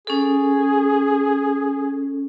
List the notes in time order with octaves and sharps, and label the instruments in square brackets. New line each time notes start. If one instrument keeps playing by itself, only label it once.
[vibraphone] C#4 A4 [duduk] G#4